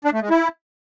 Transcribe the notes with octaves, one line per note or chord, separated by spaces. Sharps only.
D4
A3
G#3
E4